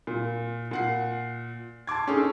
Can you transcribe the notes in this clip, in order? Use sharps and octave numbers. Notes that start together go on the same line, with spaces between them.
A#2
A#2 F#5 C7
A5 C6 D6 G#6
C#4 D#4 G#4 A4